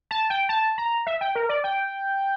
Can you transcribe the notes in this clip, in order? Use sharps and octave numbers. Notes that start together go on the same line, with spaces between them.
A5
G5
A5
A#5
E5
G5
A#4
D5
G5